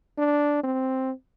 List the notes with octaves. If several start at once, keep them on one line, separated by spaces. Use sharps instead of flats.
D4
C4